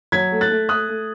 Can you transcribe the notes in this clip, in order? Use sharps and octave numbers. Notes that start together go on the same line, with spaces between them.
F#3 G#6 B6
A3
F#6 A6
A3
A3 D#6 F#6
A3